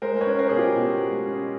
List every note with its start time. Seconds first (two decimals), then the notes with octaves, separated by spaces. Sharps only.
0.02 G#3 A#4 C5
0.16 C5
0.21 B4 C#5
0.26 C#4
0.39 A#4 C5
0.49 B2 G#4
0.57 F4 G4
0.75 B2
1.00 G#3
1.26 C#4